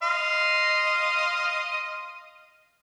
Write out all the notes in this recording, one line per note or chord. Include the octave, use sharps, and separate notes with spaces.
D#5 F5 C6